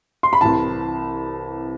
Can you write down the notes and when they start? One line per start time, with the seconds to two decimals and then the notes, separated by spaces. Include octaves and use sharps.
0.23 C6
0.33 B5
0.41 C2 C3 E3 A5